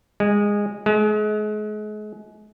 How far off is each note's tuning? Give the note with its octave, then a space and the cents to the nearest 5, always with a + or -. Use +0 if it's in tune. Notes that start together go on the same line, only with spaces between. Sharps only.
G#3 -15
G#3 +35